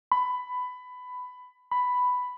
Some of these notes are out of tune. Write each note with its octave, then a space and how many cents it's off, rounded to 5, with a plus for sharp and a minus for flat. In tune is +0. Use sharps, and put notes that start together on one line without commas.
B5 +15
B5 +5